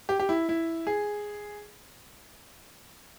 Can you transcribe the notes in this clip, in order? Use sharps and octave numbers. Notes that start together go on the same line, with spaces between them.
G4
G4
E4
E4
G#4